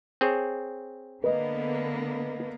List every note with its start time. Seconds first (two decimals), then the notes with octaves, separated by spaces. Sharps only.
0.21 C4 G#4 C#5
1.24 D3 A#3 B3 B4 D#5